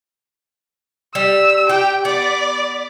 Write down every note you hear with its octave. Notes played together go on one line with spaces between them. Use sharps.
G3 E6
G4 G5
B3 D5